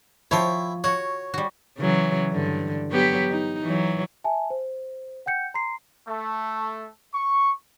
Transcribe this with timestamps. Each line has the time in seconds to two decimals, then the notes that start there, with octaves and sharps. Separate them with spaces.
0.31 F3 E4 C#5 G5
0.84 F#4 C#5 F#5
1.34 G3 F#4
1.78 C#3 E3 F#3
2.32 G2 D3
2.91 F#3 B3 G4
3.30 D#4
3.62 E3 F#3
4.24 E5 G#5 A5
4.50 C5
5.26 F#5 G5 G6 C#7
5.54 A#5 C6 C7
6.08 A3
7.15 C#6